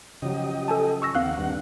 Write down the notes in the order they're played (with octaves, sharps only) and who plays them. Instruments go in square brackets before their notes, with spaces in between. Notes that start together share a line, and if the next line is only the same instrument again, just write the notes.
[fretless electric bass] C#3 F3 F#3 [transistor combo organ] G4 D#5
[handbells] A4 G#5 A5
C#6 E6 A#6
[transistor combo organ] D#2 F#5 [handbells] C4 F5 F#6
[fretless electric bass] G2